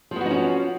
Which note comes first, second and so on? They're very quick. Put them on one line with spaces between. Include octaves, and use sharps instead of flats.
F3 B3 F#4 D#4 C#4